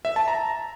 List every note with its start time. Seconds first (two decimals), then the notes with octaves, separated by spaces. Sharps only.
0.05 E5
0.16 A5
0.28 A#5